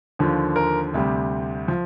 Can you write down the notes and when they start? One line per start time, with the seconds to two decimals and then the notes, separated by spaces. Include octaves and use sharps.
0.19 D#2 D3 F3
0.56 A#4
0.94 D2 C3 G3
1.68 F3